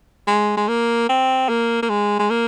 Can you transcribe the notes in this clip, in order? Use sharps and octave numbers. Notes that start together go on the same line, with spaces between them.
G#3
G#3
A#3
C4
A#3
A#3
G#3
G#3
A#3